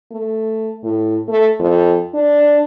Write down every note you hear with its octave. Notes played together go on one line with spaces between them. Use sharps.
A3
A2
A3
F2
D4